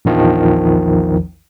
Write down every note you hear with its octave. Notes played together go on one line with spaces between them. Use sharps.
A#1 E2 D#3 F3